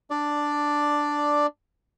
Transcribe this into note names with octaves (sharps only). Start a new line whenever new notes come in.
D4 D5